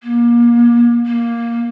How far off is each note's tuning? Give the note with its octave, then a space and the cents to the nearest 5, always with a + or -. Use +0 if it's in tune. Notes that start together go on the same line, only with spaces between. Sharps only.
A#3 +30
A#3 +5